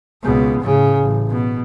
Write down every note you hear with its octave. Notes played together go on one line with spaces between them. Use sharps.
C#2 B2
A2 C#3
A1
B2